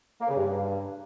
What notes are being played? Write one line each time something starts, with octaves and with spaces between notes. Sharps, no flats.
A#3
C#3
G2